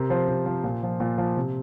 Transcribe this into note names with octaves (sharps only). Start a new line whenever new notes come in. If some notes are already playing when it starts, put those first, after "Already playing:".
Already playing: C3 A#4
F3 C5
C3
F3
A#2
F3
A#2
F3
C3